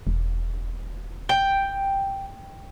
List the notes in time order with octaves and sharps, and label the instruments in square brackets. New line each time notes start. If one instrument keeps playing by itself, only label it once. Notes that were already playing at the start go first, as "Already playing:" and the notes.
[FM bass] E1
[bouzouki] G5